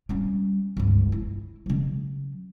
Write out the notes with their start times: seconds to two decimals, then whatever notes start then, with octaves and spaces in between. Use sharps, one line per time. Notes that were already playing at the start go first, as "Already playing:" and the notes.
0.09 G3 C#4
0.77 G1 C#2
1.12 E4
1.66 C#3 F#3